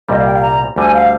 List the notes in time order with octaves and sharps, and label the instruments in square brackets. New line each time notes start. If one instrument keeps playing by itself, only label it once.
[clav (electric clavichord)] C2 A#2 G3 [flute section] D#5
[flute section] F5
G5
F5
A#5
[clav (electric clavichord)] D2 D3 G3 [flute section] G#5
[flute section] F5